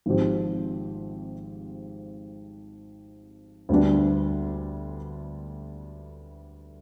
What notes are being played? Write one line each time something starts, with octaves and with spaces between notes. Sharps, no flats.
G#1 G#2 F3 C4 G4
D2 D3 G3 B3 D4